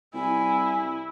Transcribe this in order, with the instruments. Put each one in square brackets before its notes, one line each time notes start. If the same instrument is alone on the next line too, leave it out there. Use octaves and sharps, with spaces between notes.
[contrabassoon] C2 [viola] E4 [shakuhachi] G#5